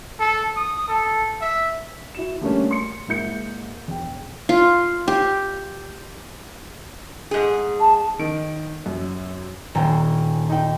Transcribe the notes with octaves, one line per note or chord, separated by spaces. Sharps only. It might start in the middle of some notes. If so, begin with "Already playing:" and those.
A4
D#6
A4
E5
E4 F#4 E7
D3 G3 A3 A#3 C#4
C6 C#7
G#2 A#3 E4 G6 C#7
E1 G5
F4
G4
G#2 G#4
A5
D#3 D7
F#2
D#1 G5 G#5 A#5
D#4 G5